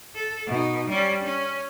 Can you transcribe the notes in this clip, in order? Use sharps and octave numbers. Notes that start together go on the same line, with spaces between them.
A4
B2 D#4
G3 C#4
C#4